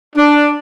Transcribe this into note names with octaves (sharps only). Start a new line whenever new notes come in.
D4